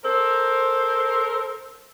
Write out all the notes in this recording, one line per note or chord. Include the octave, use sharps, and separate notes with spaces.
A4 A#4 C5